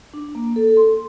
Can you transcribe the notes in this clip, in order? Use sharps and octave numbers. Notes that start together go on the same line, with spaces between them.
D4
A#3
A4
C6